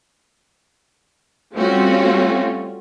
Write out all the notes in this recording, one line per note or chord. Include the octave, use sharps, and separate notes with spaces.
G3 A3 C4 C#4 F4 F#4